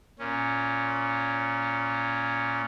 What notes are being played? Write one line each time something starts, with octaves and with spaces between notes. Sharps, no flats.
A#2 C#4